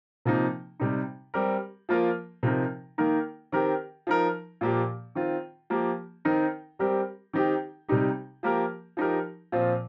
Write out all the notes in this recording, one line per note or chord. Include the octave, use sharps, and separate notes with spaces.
C3 F3 A#3 D#4
C3 G3 D#4
G3 C4 G4 A#4
F3 A#3 F4 A#4
C3 F3 D#4 A#4
D#3 A#3 D#4 A#4
D#3 C4 G4 A#4
F3 D#4 A#4
A#2 F3 A#3 G4
D#3 C4 F4
F3 A#3 G4
D#3 C4 D#4 A#4
G3 C4 G4 A#4
D#3 C4 D#4 G4
C3 G3 D#4 G4
F3 A#3 G4 A#4
F3 D#4 G4 A#4
A#2 F3 C4 F4